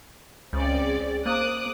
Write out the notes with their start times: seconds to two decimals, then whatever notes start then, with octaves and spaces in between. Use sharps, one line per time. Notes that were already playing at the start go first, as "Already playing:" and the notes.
0.53 C#2 C4 C#4 D5
0.85 G#4
1.26 A#3 C5 D6 D#6 F#6